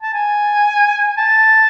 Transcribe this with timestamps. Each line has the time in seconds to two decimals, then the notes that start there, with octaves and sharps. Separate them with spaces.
0.03 A5
0.14 G#5
1.18 A5